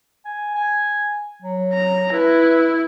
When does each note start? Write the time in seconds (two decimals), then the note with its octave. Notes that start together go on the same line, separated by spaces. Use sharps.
0.25 G#5
0.55 G#5
1.42 F#3
1.73 A#5
2.12 E4 B4